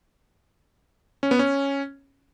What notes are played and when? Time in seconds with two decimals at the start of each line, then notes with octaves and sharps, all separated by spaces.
1.23 C#4
1.31 B3
1.39 C#4